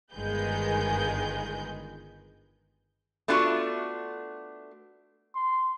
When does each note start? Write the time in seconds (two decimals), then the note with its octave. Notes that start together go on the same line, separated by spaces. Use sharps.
0.13 G1 D#3 G#3 G#4 B4 G6
3.28 A3 B3 D4 F4 F#4
5.35 C6